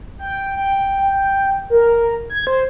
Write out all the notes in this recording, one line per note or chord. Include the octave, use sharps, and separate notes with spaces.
G5
G5
A#4
G#6
C5